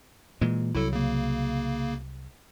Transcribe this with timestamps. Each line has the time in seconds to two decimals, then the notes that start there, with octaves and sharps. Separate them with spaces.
0.41 A#2 E3 G#3
0.75 C2 F#3 E4 A4
0.93 C#3 A#3